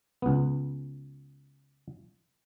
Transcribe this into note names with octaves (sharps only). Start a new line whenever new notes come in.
C#2 B3